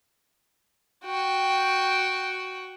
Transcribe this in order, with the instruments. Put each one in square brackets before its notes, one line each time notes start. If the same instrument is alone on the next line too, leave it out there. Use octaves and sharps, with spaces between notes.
[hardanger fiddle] F#4 G5